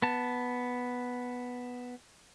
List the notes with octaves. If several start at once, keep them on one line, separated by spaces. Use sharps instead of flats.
B3 A5